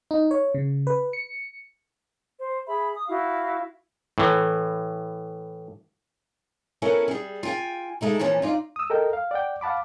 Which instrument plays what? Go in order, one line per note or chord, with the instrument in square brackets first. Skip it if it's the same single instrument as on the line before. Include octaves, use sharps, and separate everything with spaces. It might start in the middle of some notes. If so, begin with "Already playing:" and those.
[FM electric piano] D#4
C#5
C#3
B4
C#7
[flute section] C5
G#4 E5 B5
D#6
E4 F#4 F5
[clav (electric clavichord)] A2 E3
[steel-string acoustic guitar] B3 C#4 E4 A4 A#4 G#5
G3 G#4
F4 G5 G#5
G#3 A3 D#4 E4
A#2 E3 F3 C#4
D#4 F4 D5
[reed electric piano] D#6 E6
A4 A#4 D#5 G5
F5
D5 F#5 G5
F5 F#5 A5 B5 D6